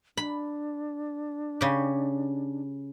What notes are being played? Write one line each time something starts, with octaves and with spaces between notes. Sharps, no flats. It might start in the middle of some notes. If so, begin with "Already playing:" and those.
D4 B5
C#3 G4